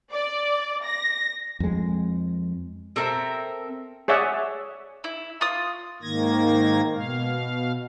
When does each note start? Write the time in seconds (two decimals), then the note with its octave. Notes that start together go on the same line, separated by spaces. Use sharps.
0.13 D5
0.85 A#6
1.60 F2 G#3
2.96 C4 A4 A#4 E5
4.08 G#4 C#5 D5 E5 F#5
5.04 E4
5.41 F4 D#6
6.02 G#2 D#3 A#3 G#6 A#6
6.94 B2 F5